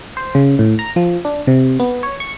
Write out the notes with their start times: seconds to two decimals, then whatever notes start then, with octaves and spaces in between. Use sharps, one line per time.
0.17 C5
0.35 C#3
0.59 A2
0.79 A#5
0.96 F3
1.25 D4
1.47 C3
1.80 B3
2.03 C#5
2.20 C#6